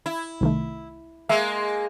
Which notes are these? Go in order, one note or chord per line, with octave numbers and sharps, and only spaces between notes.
E4
C2 D#3 A3
G#3 A#3 E5